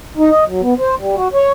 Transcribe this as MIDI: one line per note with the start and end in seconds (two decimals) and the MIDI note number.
0.17 0.29 63
0.30 0.44 75
0.47 0.61 54
0.62 0.74 59
0.79 0.95 72
0.99 1.15 55
1.16 1.28 66
1.34 1.52 73